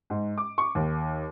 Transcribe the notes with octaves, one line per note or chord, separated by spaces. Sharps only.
G#2
D6
C#6
D#2